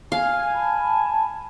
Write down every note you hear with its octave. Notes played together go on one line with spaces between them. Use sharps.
F5 G#5
A5 B5